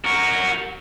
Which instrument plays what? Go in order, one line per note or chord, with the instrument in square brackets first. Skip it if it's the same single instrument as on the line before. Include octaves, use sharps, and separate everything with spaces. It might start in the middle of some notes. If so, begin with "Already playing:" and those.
[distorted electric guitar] F#4 A#4